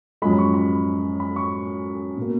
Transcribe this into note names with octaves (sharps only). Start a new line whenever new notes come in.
F#2 F3 G#3 B5
B5
C#6
B5
B5
C#6
B2 A#3